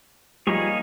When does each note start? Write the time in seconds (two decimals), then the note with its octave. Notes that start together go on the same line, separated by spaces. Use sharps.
0.47 F3 G3 A#3 D#4 G#4 C#5